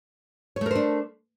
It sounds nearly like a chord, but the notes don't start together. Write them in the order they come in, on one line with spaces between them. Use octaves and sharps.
C#5 A3 A#4 C5 D4